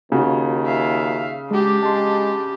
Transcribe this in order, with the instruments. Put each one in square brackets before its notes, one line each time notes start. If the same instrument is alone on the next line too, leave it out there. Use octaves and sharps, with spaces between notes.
[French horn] D#2 [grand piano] C#3 [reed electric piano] F4 F#4
[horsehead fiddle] E5 F5
[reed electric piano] G#3 [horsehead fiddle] D4 G4
[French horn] G#3 [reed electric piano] A5 C6